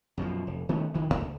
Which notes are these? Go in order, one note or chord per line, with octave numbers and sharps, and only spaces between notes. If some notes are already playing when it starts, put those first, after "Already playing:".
F#2 B2 D3 F3
F1
D#3 A3 B3 C#4
D#3 E3 G#3
D1 C#2
C#2